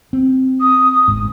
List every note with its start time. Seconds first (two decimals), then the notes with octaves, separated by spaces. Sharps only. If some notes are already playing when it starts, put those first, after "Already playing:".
0.13 C4
0.61 D#6
1.08 G1 G#2